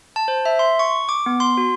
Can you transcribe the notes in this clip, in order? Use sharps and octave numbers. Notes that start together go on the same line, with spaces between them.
A5
C5
E5
C6
C#6
D6
B3
C6
F#4